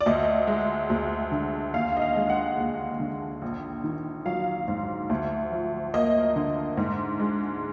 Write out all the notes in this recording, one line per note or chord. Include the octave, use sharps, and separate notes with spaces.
D5
D2 D#5
G#3
D2
D3
D#2 F5
D#5
F5
G#3
F#5
D#2
D3
A#1
D#3
F#3 F5
G#2
D2
F3
A#3 D#5
D3
G#2
G#3